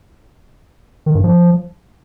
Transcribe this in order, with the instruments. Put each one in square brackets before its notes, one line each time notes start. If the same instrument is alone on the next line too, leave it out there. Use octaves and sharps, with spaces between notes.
[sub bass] D#3
G2
F3